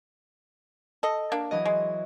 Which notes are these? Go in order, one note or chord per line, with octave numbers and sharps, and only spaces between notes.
A4 D#5
A#3 D4
E3 F#3 D#5
G#3